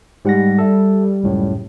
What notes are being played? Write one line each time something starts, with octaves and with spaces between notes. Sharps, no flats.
G#2 G3 F#5 A#6
A4 E5
C#2 F#2 A2